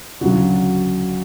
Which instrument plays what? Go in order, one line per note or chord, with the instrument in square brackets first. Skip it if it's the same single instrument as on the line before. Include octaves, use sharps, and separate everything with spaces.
[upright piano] D2 C#3 F#3 F#4